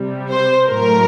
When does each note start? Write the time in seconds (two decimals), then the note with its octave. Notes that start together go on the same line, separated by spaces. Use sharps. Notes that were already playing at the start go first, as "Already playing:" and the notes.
Already playing: C3 G3
0.29 C5
0.68 A2 F#3 A3 A#4